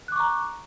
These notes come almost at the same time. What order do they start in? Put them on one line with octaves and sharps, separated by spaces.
F#6 D6 C#6 A#5